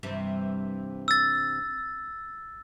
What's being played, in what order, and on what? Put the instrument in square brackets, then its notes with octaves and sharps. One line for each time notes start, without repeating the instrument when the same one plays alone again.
[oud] G2 C3 E3
[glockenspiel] E6 A6